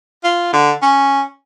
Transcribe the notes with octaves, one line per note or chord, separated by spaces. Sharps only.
F4
D3
C#4